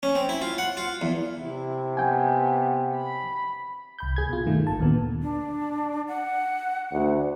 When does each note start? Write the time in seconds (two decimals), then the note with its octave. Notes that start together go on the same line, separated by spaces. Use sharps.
0.03 C#4
0.15 C4
0.29 E4
0.42 F4
0.58 F#5
0.77 F4
1.02 E2
1.37 C3 E4
1.97 B3 G5 G#5
2.95 B5
3.99 C2 B5 G6
4.16 D2 G#4 G#6
4.29 B2 F4
4.46 G2 D#3 A3
4.67 G#1 A5
4.80 D#2 A#2 D3 B3
5.22 D4
6.08 F#5
6.92 D2